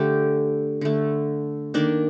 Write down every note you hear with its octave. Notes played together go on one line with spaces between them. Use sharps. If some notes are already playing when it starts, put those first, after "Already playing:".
Already playing: D3 A3 G4
D3 A3
D#3 A#3 D4